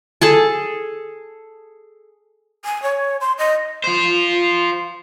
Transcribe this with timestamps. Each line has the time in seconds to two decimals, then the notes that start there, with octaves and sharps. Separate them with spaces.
0.21 G#4 A4 A5
2.65 G#5
2.83 C#5
3.21 C6
3.38 D#5
3.84 F4 C5